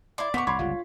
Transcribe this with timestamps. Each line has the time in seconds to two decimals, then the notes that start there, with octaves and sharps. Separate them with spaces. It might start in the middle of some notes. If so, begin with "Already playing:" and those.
0.18 E4 D5 C6
0.34 D3 B3 C5 C#6 D6 B6
0.47 C2 C#5 B5 C6 D6
0.59 G1 C#2 G3 F4